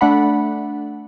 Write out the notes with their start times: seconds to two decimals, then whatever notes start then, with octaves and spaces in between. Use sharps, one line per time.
0.01 A3 D4 F#5 B5